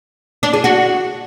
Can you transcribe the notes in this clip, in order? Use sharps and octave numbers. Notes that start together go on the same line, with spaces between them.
D4
G#4
F#4